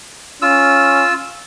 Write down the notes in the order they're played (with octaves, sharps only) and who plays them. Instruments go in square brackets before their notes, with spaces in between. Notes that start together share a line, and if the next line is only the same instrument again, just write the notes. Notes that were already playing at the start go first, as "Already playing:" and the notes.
[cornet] C#4 [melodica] F4 E6